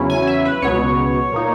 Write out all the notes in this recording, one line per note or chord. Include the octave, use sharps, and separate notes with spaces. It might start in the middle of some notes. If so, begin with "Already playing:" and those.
Already playing: E2 C#3 F#3 C#4 E4
G#5
E5
B4
C#2 B2 F#3 B3 C#5
A#2 A#3 D#4